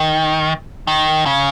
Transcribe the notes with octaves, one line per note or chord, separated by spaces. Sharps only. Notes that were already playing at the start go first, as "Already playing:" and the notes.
Already playing: D#3
D#3
C#3